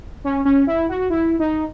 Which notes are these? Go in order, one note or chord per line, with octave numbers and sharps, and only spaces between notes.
C#4
C#4
E4
F#4
E4
D#4